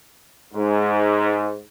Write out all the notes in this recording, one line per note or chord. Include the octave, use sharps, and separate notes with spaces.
G#2